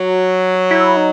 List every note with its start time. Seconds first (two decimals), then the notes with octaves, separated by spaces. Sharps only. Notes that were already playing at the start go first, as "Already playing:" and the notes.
Already playing: F#3 F#4
0.71 E4
0.97 D#4